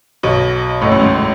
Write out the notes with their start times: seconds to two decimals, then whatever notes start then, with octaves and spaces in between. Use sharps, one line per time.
0.23 B1 B2
0.81 A1 A2
0.92 F#2
1.01 G#2